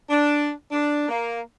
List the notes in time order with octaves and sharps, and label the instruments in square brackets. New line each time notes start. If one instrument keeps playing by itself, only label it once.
[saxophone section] D4
D4
A#3